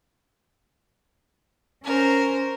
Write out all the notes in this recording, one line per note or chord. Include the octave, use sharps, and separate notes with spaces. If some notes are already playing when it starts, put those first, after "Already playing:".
C#4 A#4 C5